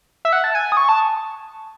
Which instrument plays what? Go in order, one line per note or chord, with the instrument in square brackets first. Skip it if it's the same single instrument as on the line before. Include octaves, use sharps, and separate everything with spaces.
[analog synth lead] E5
F#5
A5
G#5
D#6
C#6
A5